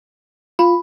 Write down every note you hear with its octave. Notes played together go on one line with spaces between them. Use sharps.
F4 B5